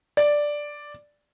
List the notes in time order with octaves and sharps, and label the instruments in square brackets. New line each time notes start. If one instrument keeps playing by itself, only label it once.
[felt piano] D5